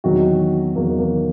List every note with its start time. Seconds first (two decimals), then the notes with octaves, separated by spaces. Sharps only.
0.04 E2 D#3 F#3 F#4
0.76 E2 D#3 F#3 A#3
0.99 A#3